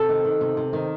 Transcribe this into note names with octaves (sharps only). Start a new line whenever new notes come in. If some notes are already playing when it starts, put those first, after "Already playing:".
Already playing: C3 A4
D#3
D#3
C3
C3
D#3